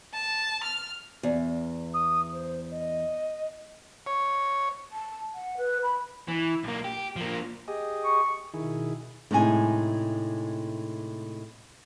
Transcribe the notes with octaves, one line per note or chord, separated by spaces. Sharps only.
A5
F6
E2
D#6
C5
D#5
C#5
A5
F#5
B4
B5
E3
B1 A#3
G4
F3 A#3
G4 G#4 D#5
C#6
B2 D#3 E4 G#4
A2 C3 G#3 D#4 D5 G#5